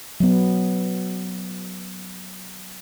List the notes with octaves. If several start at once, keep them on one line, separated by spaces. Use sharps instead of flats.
F#3 B3